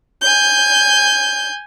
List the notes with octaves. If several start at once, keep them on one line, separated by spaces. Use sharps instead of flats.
G#5 G6